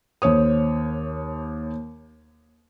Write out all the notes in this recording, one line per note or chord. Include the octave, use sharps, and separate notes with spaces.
D#2 C5 C#5 D#6